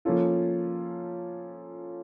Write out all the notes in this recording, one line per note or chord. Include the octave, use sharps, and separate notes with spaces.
F3 A#3 C#4 F4 A4